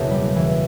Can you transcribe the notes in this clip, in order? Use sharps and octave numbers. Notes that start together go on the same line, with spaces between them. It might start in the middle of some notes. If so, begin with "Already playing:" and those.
Already playing: F#1 E2 B2
G3
E3